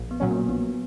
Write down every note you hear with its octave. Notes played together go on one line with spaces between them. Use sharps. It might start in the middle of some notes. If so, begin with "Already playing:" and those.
Already playing: A#1
B3
A#2 F#3 C#4
A#3
A#1 B3